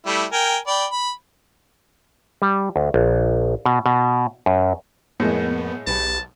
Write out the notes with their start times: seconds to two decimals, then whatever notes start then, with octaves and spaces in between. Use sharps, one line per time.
0.06 G3 A3 E4
0.32 A#4 G5 G#5
0.67 D5 G5 B5
0.91 B5
2.42 G3
2.76 D2
2.94 A#1
3.66 B2
3.86 B2
4.46 F#2
5.20 F2 A2 G#3 A#3 B3
5.87 B1 G4 B4 A5